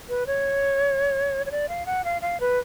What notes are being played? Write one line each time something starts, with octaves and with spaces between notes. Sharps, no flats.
B4
C#5
C#5
D5
F5
F#5
F5
F5
B4